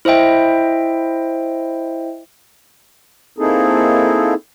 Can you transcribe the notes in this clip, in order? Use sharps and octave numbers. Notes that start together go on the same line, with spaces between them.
E4 C5 D#5 E5 G5
A#3 C4 D#4 E4 G#4 A4